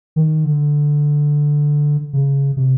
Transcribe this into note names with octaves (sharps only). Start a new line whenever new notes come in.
D#3
D3
C#3
C3